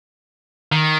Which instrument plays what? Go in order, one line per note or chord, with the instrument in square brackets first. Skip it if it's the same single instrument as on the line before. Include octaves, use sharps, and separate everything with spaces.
[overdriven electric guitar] D#3